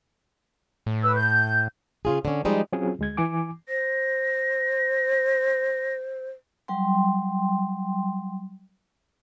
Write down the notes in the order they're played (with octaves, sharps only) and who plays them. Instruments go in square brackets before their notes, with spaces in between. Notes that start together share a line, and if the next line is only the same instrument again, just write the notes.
[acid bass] A2
[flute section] B4 E6
G6
[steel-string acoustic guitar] C#3 F4 G#4
D3 C#4
F3 G3 G#3 D#4
[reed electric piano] F#3 C4 C#4 F4 G#4
D2 G#3 G#6
E3 G#5 D6
[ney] C5 [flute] A#6
[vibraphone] F#3 G3 G5 C6